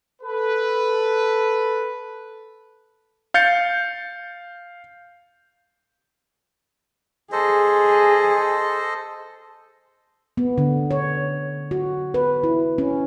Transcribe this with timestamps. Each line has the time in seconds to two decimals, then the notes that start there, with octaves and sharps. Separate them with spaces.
0.22 A4 B4
3.34 F5 G6 A6 C#7
7.32 G#4 A4 C5 D#5
10.37 B3
10.58 D3
10.91 C#5
11.71 F#4
12.14 B4
12.43 E4
12.78 C#4